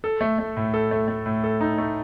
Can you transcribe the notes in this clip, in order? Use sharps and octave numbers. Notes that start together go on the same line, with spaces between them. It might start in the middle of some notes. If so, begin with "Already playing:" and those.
A4
A3
A3
A2
A4
A3
A3
A2
A4
D#4
A3